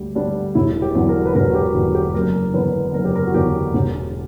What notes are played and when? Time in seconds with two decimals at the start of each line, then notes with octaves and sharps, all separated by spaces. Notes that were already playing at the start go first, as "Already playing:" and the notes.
Already playing: D2 D3 G3
0.15 D3 G3 D4
0.55 E1 E4
0.82 G4
0.95 E2 D3 F#3
1.09 A#4
1.25 B4
1.35 E1 A#4
1.49 F#4
1.55 G4
1.75 E2 D3 F#3 F#4
1.95 G4
2.14 F#1 A#4
2.54 E2 D3 B4
2.94 F#1 A#4
3.05 G4
3.15 A#4
3.26 F#4
3.34 E2 D3 G4
3.74 E1